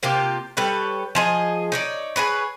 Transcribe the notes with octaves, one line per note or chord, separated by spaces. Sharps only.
C3 A#3 F4 G4
G3 A4 B4 C#5
F3 G#4 D#5
D#4 C#5 D5
G#4 A#4 B4 C#5